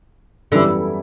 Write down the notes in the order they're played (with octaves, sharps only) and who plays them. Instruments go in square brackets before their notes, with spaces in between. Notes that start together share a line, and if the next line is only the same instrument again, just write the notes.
[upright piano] F#2 E3 G3 B3 E4 [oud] D3